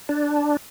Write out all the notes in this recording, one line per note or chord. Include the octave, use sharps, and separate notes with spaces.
D4